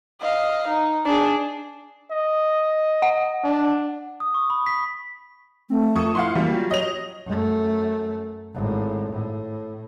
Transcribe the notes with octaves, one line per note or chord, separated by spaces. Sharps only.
D#5 F5
D#4
D4 G#4
D#5
F#5
D4
D#6
C#6
B5
B6
A3 C4
F2 F4 A4 C#6 D#6
E4 F5 F#5 C6
E3 G3 A#3 C#4 F#4
F#3 F4
C#5 D#5 F7
F#2 A3
G#1 A2
A2